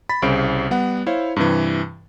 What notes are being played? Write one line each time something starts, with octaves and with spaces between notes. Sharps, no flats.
B5 A6 B6
C2 C#3 C5 D7
G3 B3 F#5
E4 C5 C#5 F5
G2 C3 E3